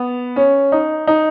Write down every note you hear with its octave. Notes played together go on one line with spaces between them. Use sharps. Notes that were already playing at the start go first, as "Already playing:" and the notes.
Already playing: B3
C#4
D#4
D#4